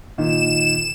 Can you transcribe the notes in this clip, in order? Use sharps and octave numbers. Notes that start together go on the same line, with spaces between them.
A#2 D#3 E7